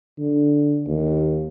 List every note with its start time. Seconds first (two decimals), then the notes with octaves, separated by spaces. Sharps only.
0.19 D3
0.88 D#2